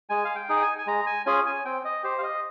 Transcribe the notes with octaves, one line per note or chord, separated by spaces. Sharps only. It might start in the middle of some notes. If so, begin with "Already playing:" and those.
G#3 G#5
F5
G5
D#4 G#4
G5
G#5
G#5
G#3 A#5
G#5
C#4 F4 G#4 G#5
G#5
C4 G5
D#5
G4 C5
F5
D#5